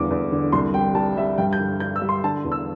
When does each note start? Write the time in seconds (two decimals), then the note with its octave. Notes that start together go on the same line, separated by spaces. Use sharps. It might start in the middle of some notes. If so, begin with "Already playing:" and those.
Already playing: E2 D3 G3 D6
0.10 E2
0.32 D3
0.52 C2 C6
0.74 G3 G5
0.95 G3 A5
1.17 G3 E5
1.38 G2 G5
1.53 G6
1.59 D3
1.80 D4 G6
1.96 E6
2.02 G3
2.09 C6
2.23 D3 A5
2.44 E2
2.52 E6